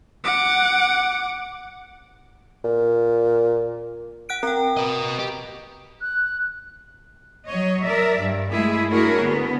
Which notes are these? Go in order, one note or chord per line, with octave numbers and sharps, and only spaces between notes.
F#5 D6
A#2
F#5 F#6 D7
C4 A#4 G5 A#5
B4 D#5
G4
F#6
F#3 C#5 D#5
A#4 D5 E5
G2
G#3 A3 E4 G#4
D4 E4 F#4 G#4 A#4 C#5
D3 B3